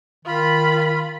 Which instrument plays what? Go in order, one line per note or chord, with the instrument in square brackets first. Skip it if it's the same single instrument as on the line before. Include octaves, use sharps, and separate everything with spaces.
[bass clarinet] D#3 [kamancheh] F4 B5